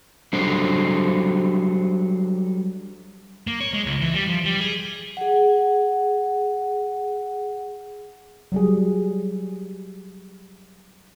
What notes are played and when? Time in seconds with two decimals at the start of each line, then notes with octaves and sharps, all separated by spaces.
0.33 F#3 G3 D4 A4 C5
3.47 A#3
3.60 C#5
3.73 G#3
3.86 C#2
4.01 E3
4.14 G3
4.27 F3
4.45 G3
4.61 G#4
5.17 G#4 F#5
8.52 F#3 G3 G#4